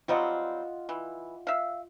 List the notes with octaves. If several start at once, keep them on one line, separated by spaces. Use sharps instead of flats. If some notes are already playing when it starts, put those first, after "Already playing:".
F#3 G3 C4 F4 D#5 F#5
E3
E5 F5